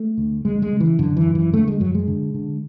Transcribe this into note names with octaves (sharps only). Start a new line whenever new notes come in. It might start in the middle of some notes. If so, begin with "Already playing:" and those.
Already playing: A3
D2
D2 G#3
G#3
C#3
E3
F#2 D3
E3
F#2
E3
D3 A3
G#3
F#2 F#3
G#3
D3
D3